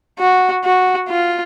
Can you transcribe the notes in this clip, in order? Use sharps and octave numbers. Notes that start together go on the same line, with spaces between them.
F#4
F#4
F4